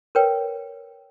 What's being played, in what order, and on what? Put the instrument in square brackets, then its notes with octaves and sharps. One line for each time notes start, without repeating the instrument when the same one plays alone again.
[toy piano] A#4 B4 C#5 G5